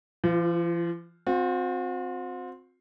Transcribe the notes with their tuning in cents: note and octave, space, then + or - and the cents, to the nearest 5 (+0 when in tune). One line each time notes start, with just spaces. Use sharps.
F3 -45 F4 +0
C4 +0 F#4 -45